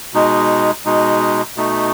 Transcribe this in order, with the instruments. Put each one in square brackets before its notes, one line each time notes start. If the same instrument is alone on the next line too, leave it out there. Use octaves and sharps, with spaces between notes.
[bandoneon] B2 G#3 D#4
B2 G#3 D#4
B2 A3 D#4